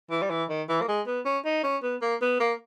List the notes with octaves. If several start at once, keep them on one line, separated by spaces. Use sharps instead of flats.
E3
G3
E3
D#3
E3
A#3
G#3
B3
C#4
D#4
C#4
B3
A#3
B3
A#3